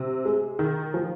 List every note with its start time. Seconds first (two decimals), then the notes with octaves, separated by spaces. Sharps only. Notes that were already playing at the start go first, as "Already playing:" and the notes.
Already playing: C3
0.25 G#3
0.59 D#3
0.94 F3